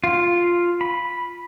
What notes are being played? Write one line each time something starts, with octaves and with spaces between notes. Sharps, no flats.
F4
B5